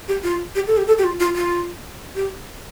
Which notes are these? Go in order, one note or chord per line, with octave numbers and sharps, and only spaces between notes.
G4
F4
G4
A4
G4
A4
G4
F4
F4
F4
G4